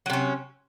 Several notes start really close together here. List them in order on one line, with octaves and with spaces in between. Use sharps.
F#3 C3 C#4